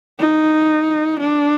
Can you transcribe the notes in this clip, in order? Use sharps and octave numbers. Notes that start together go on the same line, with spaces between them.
D#4
D4